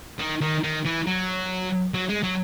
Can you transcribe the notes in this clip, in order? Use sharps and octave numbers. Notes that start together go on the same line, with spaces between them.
D#3
D#3
D#3
E3
F#3
F#3
G#3
F#3